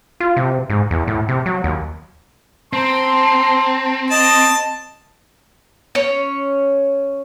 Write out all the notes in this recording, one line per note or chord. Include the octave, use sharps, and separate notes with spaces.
F4
C3
G#2
E2
A2
C3
F#3
D#2
C4 A5 A#5 C6
D#5 A5
C#4 C#5